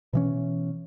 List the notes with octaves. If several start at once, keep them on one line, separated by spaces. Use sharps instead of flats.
B2 E3 C#4